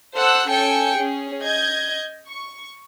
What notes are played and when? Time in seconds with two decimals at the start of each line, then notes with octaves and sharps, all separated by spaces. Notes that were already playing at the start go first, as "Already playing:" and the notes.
0.15 A4 C5 F#5 E6 F#6
0.48 C#4 A4 G5 G#5 C#7
0.96 C#4 G#4
1.43 D#5 G6 G#6
2.27 C#6